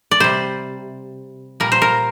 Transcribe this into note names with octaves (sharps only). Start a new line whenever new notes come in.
D5
C3 G3 C5
A#2 G3 A#4
C5
A#4